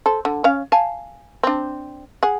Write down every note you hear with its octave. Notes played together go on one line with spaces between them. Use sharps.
A4 C5
D3
C#4 F5
F5 G#5 A5
C4 D4
G#4 F#5